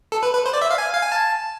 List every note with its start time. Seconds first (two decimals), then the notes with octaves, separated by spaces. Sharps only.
0.12 A4
0.23 B4
0.34 B4
0.46 C5
0.53 D5
0.62 E5
0.71 F5
0.78 G#5
0.94 F5
1.03 G#5
1.12 A5